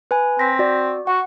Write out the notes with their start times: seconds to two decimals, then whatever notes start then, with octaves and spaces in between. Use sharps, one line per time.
0.11 B4 G#5
0.39 C4 A#6 B6
0.59 F#4 D5
1.07 F#4 F#5